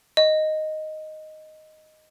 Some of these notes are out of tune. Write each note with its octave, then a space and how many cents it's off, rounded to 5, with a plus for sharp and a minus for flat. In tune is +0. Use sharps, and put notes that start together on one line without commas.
D#5 +0